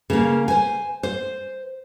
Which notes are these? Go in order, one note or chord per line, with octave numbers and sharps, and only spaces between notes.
C#3 A#3
C5 G#5
C5